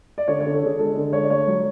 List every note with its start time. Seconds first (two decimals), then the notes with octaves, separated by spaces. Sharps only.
0.18 D5
0.28 D3 C#5
0.40 C#5
0.46 D3
0.54 A4
0.62 D3 G#4
0.79 G#3 A4
0.96 D3
1.13 G#3 C#5
1.23 D5
1.30 A3 C#5
1.48 F#3